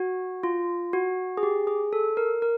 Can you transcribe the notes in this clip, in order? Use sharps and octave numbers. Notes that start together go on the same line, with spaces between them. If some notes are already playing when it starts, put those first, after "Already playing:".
Already playing: F#4
F4
F#4
G#4
G4
G#4
A4
A#4
A#4